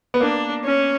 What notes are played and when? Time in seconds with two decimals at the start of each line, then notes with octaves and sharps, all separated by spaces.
0.14 B3
0.21 A#3 D4
0.65 C#4